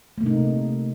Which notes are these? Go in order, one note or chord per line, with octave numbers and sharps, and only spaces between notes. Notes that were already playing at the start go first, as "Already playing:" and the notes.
C3 A3 A#3 D#4